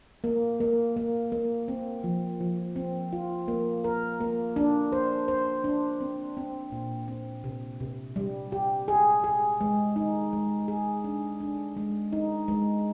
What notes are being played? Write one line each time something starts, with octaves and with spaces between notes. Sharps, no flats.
A#3
A#3
A#3
A#3
C4
F3
F3
C4
F4
A#3
A#4
A#3
D4
C5
C5
D4
C4
C4
A#2
C4
C3
C3
G3
G4
G#4
G#4
G#3
D#4
G#3
G#4
D4
D4
G#3
D#4
G#3